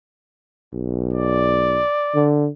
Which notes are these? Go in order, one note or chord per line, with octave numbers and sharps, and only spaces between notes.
B1
D5
D3